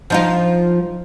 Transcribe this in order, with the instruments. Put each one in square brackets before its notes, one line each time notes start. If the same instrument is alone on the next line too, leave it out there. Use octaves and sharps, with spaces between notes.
[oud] F3 D#4 F4